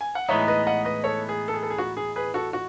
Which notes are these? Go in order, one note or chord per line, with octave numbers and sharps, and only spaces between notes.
G#5
F#5
A2 E3 G#3 B3 D#4 C#5 E5
B4 D#5
D#5 F#5
B4 D#5
A4 C#5
G#4
A4
G#4
A4
G#4
F#4
G#4
G#4 B4
F#4 A4
F#4